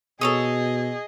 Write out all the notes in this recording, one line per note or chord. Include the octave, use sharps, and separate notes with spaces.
B2 G#4 A4 C#5 D#5 D#6